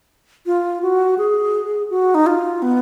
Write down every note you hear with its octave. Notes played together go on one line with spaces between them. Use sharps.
F4
F#4
G#4
F#4
D#4
F4
B3